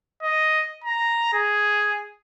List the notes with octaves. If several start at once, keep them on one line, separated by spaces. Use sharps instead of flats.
D#5
A#5
G#4